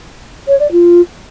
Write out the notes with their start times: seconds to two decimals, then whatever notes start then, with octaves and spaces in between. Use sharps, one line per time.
0.47 C#5
0.59 D5
0.71 F4